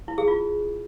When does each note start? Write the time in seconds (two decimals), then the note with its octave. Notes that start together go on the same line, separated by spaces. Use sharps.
0.08 E4
0.18 G#4
0.28 F4